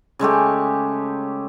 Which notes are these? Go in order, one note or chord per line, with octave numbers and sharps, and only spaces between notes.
C#3 G#3 A3 G4